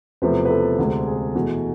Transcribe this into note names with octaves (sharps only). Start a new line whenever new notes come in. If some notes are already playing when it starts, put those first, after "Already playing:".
E1 E2 C3 F3 A3 B4
B4
A4
D2 C3 G#3
G#4
E2 B2 A3